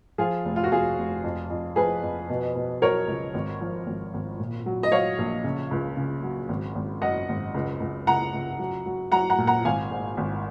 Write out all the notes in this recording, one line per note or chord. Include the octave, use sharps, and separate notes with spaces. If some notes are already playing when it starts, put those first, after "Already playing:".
F3 F4 G#4
F1
F4
F#4
F1 F4 G#4
F1
F2
F2
F3 G#4 B4
F2
B2
B2
F#3 A#4 C#5
C#2
G#1
F3
G#1
G#1
A#2
F#3
D#5
F#3 C#5 F5
A#1
C#3
C#2
C#3
F#3
G#1
G#1
F#2 D#5 F#5
G#1
C#2
C#2
C#2 F#5 A#5
C#2
F#3
F#3
F#3 F#5 A#5
F#5 A#5
A#2
F#5 A#5
G#1 F5 G#5
G#2
G#1